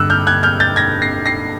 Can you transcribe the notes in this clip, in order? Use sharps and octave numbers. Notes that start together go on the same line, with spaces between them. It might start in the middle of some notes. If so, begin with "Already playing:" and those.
Already playing: G2 D3 E6 F#6
F6 G6
F#6 G#6
F6 G6
G6 A6
G#6 A#6
A#6 C7
A#6 C7